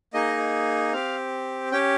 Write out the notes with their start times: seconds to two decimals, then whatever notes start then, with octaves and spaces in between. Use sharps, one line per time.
0.14 A#3 D#4 G#4 D#5
0.92 C4 G4 F5
1.72 C#4 G4 G5